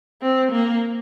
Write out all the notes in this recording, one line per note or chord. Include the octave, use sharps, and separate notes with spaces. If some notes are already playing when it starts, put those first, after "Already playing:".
C4
A#3